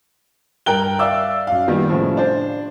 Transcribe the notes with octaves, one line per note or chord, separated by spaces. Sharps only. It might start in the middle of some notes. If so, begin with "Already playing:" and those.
G2 A#4 G5 F#6 G7
D5 E5 F5 D6 E6
F#2 F5
D#3 G3 A#3 B3 F4
A2 C#3 F3
D4 C5